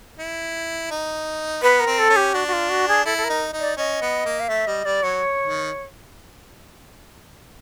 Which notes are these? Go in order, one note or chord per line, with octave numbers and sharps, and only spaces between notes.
E4
D#4
B3 B4
A#4
C4
A4
C#4
G4
D4 F#4
F#4
F4
F#4
G#4
E4 A4
A4
A#4
D#4
D#4
D5
C#4 D#5
B3
A#3
F5
A3 E5
G3 D#5
G3 D5
F#3 C#5
D#3